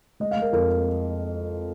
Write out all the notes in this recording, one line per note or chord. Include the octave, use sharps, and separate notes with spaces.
G#3 D#5
F5
G#3
A#4
F2 A#4